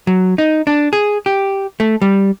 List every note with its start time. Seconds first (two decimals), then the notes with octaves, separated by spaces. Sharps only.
0.07 F#3
0.38 D#4
0.67 D4
0.93 G#4
1.26 G4
1.80 A3
2.02 G3